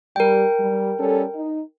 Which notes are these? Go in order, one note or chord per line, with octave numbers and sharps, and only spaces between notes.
G3 A#4 G5
G3
G3 C#4 A4
D#4